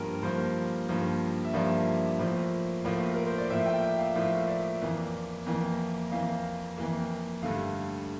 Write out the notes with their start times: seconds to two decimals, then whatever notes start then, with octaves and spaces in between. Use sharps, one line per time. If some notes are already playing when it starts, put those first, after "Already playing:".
Already playing: G2 F3 A#3 A#4
0.23 G2 F3 A#3 C5
0.89 G2 F3 A#3
1.45 E5
1.54 G2 F3 A#3 D5
2.19 A2 F3 A#3
2.85 A2 F3 A#3
3.14 A#4
3.26 C5
3.38 D5
3.50 A2 F3 A#3 E5
3.66 G5
3.82 G5
3.99 F5
4.15 A2 F3 A#3 E5
4.48 D5
4.82 F2 E3 A#3
5.46 F2 E3 A#3
6.12 F2 E3 A#3 F5
6.78 F2 E3 A#3
7.43 G2 D3 A3 F5